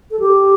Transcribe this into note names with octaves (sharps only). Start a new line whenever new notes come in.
A4
G4